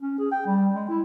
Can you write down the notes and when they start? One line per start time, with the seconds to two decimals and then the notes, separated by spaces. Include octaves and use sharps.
0.01 C#4
0.19 G#4
0.32 G5
0.46 G3
0.74 G#3
0.89 E4